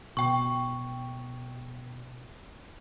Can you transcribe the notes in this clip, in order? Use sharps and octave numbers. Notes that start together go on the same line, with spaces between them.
B2 G5 C#6